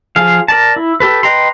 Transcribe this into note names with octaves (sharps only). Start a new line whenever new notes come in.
F3 G#4 F5
A#4 D5 A5
E4
G4 A4 B4
B4 D#5 G5 A#5 C6